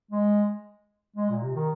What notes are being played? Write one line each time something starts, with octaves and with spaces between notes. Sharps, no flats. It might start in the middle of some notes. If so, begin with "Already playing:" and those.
G#3
G#3
A#2
C3
D#3